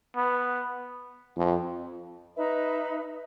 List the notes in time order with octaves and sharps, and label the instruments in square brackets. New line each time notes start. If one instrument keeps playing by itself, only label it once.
[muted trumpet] B3
[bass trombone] F2
[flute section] D#4 B4 D#5 E5